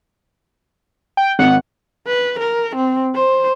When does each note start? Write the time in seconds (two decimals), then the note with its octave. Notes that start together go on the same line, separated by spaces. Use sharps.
1.17 G5
1.39 G#1 F#5 C#7
2.07 B4
2.39 A#4
2.76 C4
3.15 C5